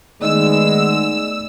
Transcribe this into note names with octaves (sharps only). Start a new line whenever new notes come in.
D#3 G#3 A3 B3 D#4 D5 D#5 E6